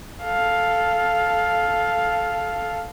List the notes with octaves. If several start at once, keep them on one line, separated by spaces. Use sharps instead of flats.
A4 F5